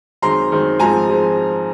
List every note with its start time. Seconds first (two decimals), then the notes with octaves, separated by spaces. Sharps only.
0.22 F#2 D#3 G#3 C4 A#5 C6
0.51 F#2 D#3 G#3 C4
0.80 G#2 F3 G#3 C4 G#5 A#5
1.09 F3 G#3 C4